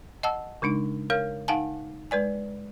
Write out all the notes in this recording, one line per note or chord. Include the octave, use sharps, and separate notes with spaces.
D#5 F#5 A5 E6
C#3 G#3 D4 D#4
A#4 C#5 F5 F6
D#4 F5 F#5 G#5 A5
G#3 B4 D5 G#5